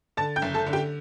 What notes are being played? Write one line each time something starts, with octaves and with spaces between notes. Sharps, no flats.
D3 A5 A6
G5 G6
F#1
A4 A5
D3
G4 G5